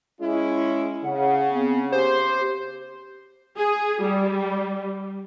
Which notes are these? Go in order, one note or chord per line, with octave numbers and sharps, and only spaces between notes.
G#3 C#4 E4
C#3 F#5
B3 C4
G4 C5
G#4
G3